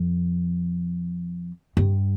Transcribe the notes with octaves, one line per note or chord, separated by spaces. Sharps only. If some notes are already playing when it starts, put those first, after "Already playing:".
Already playing: F2
G2